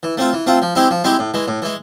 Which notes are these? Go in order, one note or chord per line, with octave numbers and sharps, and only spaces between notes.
E3
A3 C4 F4
E3
A3 C4 F4
F3
G#3 C4 E4 G4
F3
G#3 C4 E4 G4
A2
E3 G#3
A2
E3 G#3